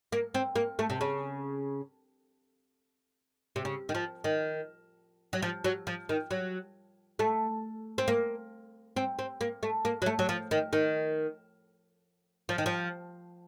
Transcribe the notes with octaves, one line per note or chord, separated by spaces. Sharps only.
A#3
C4
A#3
A3
C3
C#3
C3
C#3
D#3
F3
D#3
F#3
F3
F#3
F3
D#3
F#3
A3
C4
A#3
C4
C4
A#3
A3
A#3
F#3
A3
F#3
F3
D#3
D#3
F3
D#3
F3